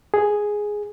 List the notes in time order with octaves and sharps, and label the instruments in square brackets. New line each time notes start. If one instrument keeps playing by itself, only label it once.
[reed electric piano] G#4